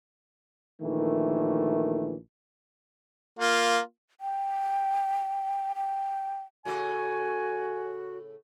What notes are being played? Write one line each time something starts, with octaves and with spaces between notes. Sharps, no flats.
A#1 D#3 E3 A3
A#3 F4
G5
G5
A2 C#3 A3 F#4 G#5